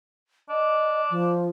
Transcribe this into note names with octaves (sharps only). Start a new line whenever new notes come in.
D4 D#5
F3